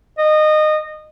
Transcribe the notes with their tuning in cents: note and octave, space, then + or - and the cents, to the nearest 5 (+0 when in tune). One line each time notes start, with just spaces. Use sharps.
D#5 -20